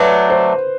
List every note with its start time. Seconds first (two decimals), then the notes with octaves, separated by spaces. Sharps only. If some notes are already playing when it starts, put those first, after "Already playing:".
Already playing: F#3 A3 D4 B4
0.30 C5